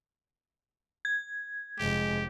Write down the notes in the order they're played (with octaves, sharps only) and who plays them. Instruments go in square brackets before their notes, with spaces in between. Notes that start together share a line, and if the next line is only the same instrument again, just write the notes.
[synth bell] G#6
[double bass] F1 [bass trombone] G#3 [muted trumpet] G4